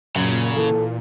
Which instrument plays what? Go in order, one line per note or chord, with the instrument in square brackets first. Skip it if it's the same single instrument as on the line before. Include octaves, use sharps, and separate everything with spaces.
[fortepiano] F#2 [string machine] A#2 [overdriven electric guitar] C#3
[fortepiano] E3 [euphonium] A4